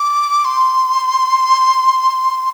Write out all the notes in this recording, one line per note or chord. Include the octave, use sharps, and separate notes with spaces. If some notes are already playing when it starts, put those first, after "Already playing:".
Already playing: D6
C6